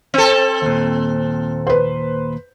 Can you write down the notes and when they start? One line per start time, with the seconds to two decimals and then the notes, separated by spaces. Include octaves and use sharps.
0.14 C4 A4
0.62 D#2 A#2
1.67 B4 C5